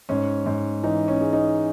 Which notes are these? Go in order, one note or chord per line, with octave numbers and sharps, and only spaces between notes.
G#2 C#4
G#2
E3 D#4
C#4
G#3
D#4